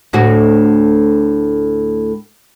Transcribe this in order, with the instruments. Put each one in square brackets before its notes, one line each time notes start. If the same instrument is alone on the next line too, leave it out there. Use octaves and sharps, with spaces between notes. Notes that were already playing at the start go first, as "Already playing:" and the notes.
[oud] D2 A2 F#4